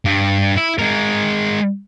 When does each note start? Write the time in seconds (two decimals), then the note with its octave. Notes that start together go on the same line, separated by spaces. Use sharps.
0.05 G2
0.56 E4
0.79 G#3 A#4